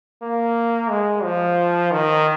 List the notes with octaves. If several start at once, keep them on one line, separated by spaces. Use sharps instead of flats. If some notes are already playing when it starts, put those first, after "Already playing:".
A#3
G#3
F3
D#3